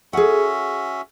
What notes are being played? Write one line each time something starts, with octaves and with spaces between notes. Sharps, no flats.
C#4 F#4 G#4 E5 F#5